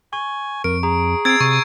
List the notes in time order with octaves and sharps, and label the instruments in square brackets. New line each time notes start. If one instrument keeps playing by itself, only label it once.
[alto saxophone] G#5 [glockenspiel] C#6
[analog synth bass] F2 [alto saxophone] A#4 [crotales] D7
[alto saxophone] G#4 [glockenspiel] A#5
[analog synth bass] C4 [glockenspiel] E6 C7 [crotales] G#6 A6 D7
[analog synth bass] C3 [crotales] C#6